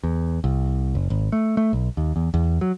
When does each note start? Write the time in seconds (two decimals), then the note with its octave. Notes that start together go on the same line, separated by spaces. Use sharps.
0.03 E2
0.44 C2
0.95 F#1
1.10 G#1
1.32 A3
1.57 A3
1.73 B1
1.97 D#2
2.16 E2
2.34 E2
2.61 F#3